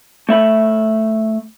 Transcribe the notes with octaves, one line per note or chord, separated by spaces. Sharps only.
A3 E5 B5